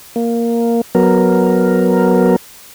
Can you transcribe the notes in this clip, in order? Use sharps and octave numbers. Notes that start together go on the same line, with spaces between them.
A#3
F#3 B3 A#4